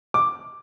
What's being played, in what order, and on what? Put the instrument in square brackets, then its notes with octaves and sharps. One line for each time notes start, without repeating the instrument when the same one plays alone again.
[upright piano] D6